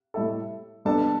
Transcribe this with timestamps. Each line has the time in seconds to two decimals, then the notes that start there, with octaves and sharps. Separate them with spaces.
0.14 A2 G3 E4 A4
0.85 G3 B3 D4 A4 A5